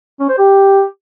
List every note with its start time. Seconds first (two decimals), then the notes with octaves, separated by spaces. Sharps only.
0.20 C#4
0.29 C5
0.38 G4